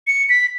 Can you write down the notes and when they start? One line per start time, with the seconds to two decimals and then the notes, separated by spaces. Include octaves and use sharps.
0.07 C#7
0.29 B6